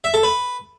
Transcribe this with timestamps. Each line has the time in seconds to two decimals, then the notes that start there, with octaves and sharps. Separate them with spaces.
0.04 E5
0.14 A4
0.23 B4